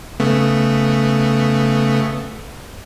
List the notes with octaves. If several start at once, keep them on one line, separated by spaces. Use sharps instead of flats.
C#3 A3 B3